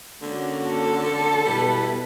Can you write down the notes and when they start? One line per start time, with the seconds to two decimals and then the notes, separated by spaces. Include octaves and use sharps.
0.22 D3 A#3 C#4 F#4
0.68 A4
1.45 B2 G3 E4 B4